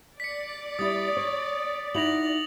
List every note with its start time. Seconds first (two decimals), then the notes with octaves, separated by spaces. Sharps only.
0.20 D5 B6 C#7
0.79 G3 E4 D#6 A6
1.17 C#5
1.95 D#4 E4 F#4 A#6 F7 F#7